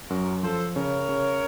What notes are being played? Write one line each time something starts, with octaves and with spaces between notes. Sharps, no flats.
F#2 F#4 A#4
F3 A4 C5
C#3 A#4 C#5
C#3